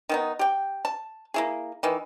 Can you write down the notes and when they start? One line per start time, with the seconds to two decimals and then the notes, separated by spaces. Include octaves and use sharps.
0.09 D#3 B3 D#4
0.39 G4 G5
0.85 A5
1.34 A#3 E4 G#4
1.83 D#3 E3